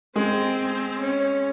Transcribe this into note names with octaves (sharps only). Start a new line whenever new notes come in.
G#3 C4 G#4
C#4